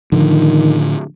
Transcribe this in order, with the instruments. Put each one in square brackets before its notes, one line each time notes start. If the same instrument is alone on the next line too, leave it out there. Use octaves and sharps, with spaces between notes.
[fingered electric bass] A2 D3 F3 [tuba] D#3